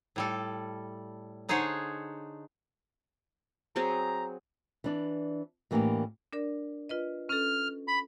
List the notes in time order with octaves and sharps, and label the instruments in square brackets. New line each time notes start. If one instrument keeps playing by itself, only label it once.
[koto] A2 G3 A4
D3 D#4 G#4 C5 C#5 F#5
[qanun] F#3 C4 G#4 [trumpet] A#5
[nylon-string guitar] E3 D4 D5
A2 E3 A#3 B3 D4 G4
[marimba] D4 A#4 D5
F4 B4 D#5
[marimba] C#4 A4 [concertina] F6
[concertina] B5